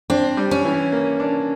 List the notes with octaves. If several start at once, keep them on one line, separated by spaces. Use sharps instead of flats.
C4 D4
G3
C#4
E3
A#3
D4